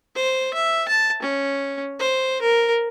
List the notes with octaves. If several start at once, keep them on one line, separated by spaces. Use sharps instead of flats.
C5
E5
A5
C#4
C5
A#4